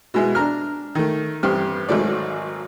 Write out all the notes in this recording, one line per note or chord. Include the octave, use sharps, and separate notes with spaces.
B2 G#3 E4
D4 A#5 F6
D#3 A3
A1 G2 C4 G4 F6
G#1 G#2 F#3 A3 D5